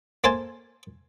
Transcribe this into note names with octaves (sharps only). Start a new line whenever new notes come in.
A#3 A4 C5 G#5 A5